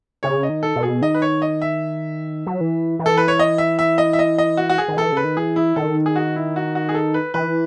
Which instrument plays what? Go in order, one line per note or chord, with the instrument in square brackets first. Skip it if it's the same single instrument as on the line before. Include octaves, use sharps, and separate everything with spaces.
[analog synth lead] C#3 [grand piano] C#5
[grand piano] D#5
[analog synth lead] D#3
[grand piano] A4
[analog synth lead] B2
[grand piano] G#4
[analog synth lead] D#3 [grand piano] D#5
[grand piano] B4
C#5
D#5
E5
[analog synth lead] F#3
E3
E3
[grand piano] A4
B4
C#5
D#5
E5
E5
D#5
E5
D#5
D#5
F#4
F#4
G#4
[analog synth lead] D#3
[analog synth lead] E3 [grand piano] A4
[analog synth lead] C#3 [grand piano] B4
[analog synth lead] D#3
[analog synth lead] E3 [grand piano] G#4
[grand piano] E4
[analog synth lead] D#3 [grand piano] A4
[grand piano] G#4
F#4
E4
F#4
F#4
G#4
A4
B4
[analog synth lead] E3 [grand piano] B4